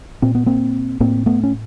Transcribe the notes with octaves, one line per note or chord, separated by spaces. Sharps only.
A#2 C4
B3
A#3 C4
A2 A#3 C4
A3 B3
C#4